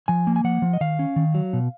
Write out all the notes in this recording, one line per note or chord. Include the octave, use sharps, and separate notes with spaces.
F3 G#5
A#3
G#5
F3 F#5
F3
D#5
D#3 F5
C#4
D#3
F#3
B2